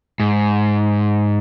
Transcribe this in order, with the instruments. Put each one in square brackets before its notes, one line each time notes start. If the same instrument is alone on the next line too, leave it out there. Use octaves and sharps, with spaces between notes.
[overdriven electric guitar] G#2